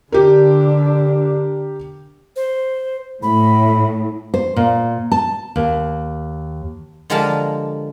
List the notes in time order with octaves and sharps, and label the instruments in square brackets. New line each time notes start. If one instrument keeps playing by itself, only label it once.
[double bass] D3 D4 [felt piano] G4 A#4
[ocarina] C5
[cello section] A2 [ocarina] B5
[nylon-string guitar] C5
A#2
A5
D#2
[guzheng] D3 F3 G#3 G4 A#4 A5